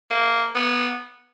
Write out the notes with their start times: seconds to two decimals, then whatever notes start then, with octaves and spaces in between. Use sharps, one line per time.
0.11 A#3
0.55 B3